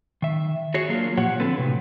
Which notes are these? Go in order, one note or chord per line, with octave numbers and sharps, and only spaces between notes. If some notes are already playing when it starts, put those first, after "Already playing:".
D#3 E5
F#4 G#4 C#5
F#3 A#3 D4 F4
A#2 F3 G4 C#5 F#5
D3 F3 C4 A4 B4
A2 C3 F#3